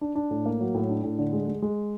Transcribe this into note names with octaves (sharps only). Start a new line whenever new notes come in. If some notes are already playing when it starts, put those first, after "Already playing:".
D4
D4
A2
A#3
F#3
A2
D4
A2
D3
G#3
G#3
G#3